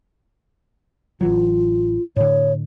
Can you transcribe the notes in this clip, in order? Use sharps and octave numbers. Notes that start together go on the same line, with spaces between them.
A1 E3 F#3 F4
A2 D3 C#5